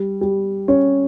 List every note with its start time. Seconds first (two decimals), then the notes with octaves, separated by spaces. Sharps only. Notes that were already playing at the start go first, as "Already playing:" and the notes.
Already playing: G3
0.21 G3
0.68 C#4